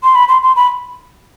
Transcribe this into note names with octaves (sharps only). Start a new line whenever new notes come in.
C6
B5
C6
C6
B5